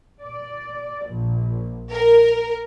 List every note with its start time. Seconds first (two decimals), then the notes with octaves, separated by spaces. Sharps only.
0.21 D5
1.07 A#1
1.91 A#4